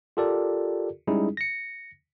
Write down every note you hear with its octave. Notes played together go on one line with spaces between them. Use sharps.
F4 G4 A4 A#4 D5
G3 G#3 C#4 D#4 E4 G#4
A#6 C#7